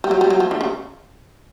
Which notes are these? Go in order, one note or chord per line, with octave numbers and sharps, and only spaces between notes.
G3
F#3
G3
F#3
F3
D3
C#3